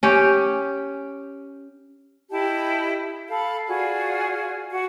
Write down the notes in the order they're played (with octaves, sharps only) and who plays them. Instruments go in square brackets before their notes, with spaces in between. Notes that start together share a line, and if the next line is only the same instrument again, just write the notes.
[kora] C#4 G4
[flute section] E4 G4 D#5 A5
A4 F5 B5
F4 F#4 G#4 D5
F#4 F#5